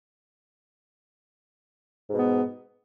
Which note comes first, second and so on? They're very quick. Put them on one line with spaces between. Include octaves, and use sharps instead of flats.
G#2 B2 B3